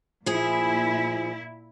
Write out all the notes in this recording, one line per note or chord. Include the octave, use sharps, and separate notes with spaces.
A#2 F3 E4 G#4